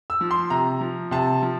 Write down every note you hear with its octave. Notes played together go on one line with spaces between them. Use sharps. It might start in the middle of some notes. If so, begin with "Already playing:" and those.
E6
F3
C6
C3 A#5
F3
C3 A5
F3